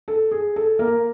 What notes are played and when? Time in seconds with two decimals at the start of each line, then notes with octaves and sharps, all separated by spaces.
0.08 A4
0.31 G#4
0.56 A4
0.79 A#3 A#4